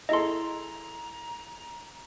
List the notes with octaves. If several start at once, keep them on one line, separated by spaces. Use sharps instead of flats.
E4 G#4 A4 D#5 A#5 C6